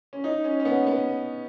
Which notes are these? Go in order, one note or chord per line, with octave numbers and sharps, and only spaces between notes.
C#4
D#4
C#4
C#4
B3
B3